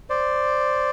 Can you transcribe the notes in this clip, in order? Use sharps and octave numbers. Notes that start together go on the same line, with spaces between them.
C5 D5